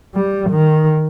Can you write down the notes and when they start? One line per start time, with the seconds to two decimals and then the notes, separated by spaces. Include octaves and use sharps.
0.15 G3
0.50 D#3